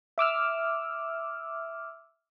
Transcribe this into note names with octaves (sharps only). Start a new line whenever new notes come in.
E5 D6 E6 F6